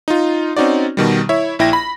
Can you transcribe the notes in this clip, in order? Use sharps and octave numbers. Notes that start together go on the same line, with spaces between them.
D#4 F4
C4 C#4 D#4 F#4 D5
B2 D#3 G3
E4 C#5 E5
A#1 E4 G5 A#6
B5